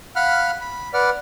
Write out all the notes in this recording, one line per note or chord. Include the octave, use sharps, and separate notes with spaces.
F5 F#5 B5 F6 F#6
B5
B4 D5 F#5 F6